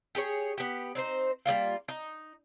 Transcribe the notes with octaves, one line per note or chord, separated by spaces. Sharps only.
G4 G#4 B4 C#5
B3 G4
C4 D#4 C5
G3 G#3 A#3 F4
D#4